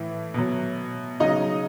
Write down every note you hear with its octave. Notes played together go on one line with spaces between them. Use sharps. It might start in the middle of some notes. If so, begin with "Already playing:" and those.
Already playing: A2 E3
B2 F#3
C#3 F#3 D#4 D#5